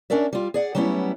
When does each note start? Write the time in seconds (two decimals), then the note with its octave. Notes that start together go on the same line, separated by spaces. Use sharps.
0.10 C#4 D4 A#4 D5 E5
0.33 G3 F4
0.54 G#4 D5 F#5
0.75 F#3 G3 A3 B3 C#4 E4